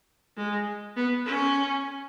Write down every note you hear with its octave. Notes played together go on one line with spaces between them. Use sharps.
G#3
B3
C#4